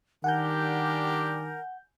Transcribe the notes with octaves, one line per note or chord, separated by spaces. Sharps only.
D#3 G3 D4 G4 A#4 F#5 G#5 G6